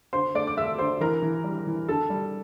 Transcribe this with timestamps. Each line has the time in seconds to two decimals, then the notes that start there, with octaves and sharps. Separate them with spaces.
0.13 D3 C5 C6
0.35 A3 D5 D6
0.47 D6
0.57 A3 E5 E6
0.78 D3 C5 C6
1.01 E3 A#4 A#5
1.22 E3
1.44 G3
1.67 E3
1.88 D3 A4 A5
2.10 G3